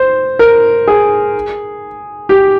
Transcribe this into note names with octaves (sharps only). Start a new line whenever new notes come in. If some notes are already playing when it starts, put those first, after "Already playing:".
Already playing: C5
A#4
G#4
G4